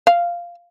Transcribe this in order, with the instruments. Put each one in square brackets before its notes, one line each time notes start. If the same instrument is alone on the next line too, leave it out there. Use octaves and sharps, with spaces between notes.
[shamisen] F5